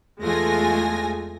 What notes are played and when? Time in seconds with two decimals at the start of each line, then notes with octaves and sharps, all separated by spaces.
0.20 E2 G#3 A3 F4 G#5 A#6